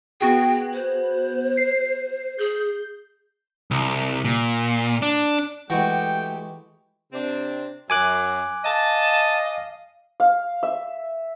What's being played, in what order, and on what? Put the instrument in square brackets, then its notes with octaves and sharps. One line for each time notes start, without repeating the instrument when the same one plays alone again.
[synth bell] B3 F#4 G#4 [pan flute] G5
[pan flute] C5
[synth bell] C7
[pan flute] G#4 [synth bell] G6
[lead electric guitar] C2
A#2
D4
[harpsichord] E3 G#3 [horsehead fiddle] A3 G4 [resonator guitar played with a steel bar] F#4 [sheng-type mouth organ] G5
[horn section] C3 C4 D4
[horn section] F#2 [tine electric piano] G#5 D6 F#6
[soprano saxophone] D#5 [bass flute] F5 [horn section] A5
[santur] F5
E5